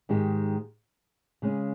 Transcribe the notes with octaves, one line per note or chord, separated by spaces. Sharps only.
G#2 D#3 G#3 D#4 G4
C#3 G#3 C#4